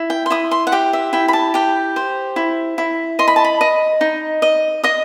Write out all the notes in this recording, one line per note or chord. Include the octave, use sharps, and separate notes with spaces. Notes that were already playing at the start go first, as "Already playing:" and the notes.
Already playing: E4
G5
C6
E4 D#6
C6
F#5
G4 G5
E5
E4 G5
B5
A5
G4 G5
C5
E4
E4
D#5 C6
B5
A5
B5
D#5
D#4
D#5
D#5 D#6